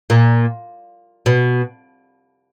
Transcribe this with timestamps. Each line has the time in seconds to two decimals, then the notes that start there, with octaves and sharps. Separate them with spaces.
0.10 A#2
1.26 B2